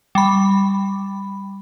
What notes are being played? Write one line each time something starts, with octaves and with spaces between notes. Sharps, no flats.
G3 B5